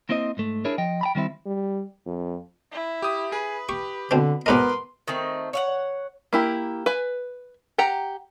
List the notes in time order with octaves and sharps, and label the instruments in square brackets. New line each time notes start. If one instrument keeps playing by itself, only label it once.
[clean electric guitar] A#3 C4 E4 C5 D#5
G#2 A3
D4 E4 G#4 A#4 C#5
F3 D#5 G5
G5 A#5 B5
D#3 G3 C4 E4
[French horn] G3
F2
[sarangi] E4
[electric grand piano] G4 D#6
[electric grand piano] G#4 [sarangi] B4
[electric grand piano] G4 [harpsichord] C#6
[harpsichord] B2 C4 [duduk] D3
[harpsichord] B1 G#2 D#5 [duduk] B3 [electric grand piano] A#4 B4 D6 [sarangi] C6
[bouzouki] D#3 A3 C4
C#5 F5 F#5
[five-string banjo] A#3 E4 G4
B4 G#5
G4 F#5 G5 A#5